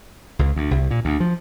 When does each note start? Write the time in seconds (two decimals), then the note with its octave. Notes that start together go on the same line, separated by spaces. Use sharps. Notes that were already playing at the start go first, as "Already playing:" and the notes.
0.39 C#2
0.56 D2
0.71 C2
0.91 A#2
1.05 D2
1.20 F3